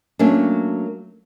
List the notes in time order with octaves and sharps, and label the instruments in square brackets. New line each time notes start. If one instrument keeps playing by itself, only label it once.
[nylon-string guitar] F#3 A3 A#3 C#4 D4